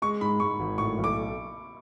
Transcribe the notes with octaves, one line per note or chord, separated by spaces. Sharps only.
G#3 C#6
G#2 B5
G#2 C#6
G#1
A2 C#6
B1
D6